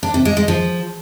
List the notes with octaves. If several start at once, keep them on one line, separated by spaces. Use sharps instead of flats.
D4
C3
G#3
G#3
F3